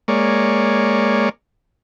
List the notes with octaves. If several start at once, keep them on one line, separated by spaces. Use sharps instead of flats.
G#3 A#3 C#5 D5